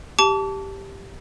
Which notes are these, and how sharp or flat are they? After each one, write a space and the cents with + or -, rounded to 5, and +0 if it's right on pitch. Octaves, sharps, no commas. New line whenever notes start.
G4 +0 A5 +0 D6 -40